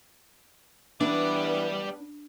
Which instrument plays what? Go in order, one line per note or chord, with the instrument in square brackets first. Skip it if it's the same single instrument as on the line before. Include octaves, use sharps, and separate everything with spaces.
[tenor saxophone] E3 [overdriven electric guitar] G3 D5 [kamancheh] B3 B4 [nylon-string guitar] D4